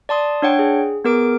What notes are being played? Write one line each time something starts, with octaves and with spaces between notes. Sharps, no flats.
D5 A5 C6 D#6
D4 C#5 F#5 G5
G#4
B3 G#4 A#4 D6 D7